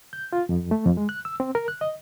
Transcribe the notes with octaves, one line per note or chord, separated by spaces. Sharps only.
G6
F4
F2
A3
F2
G#3
F#6
E6
C4
A#4
F#6
D#5